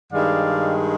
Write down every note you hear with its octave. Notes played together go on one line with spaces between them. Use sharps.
G2 D#3 G#3 D5 F5